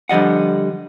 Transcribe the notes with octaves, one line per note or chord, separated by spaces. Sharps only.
D3 F3 G3 D#5 F#5